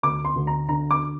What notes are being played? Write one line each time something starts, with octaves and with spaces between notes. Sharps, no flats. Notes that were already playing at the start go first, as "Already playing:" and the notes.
D2 D6
C6
D2
A#5
D3 A#5
D6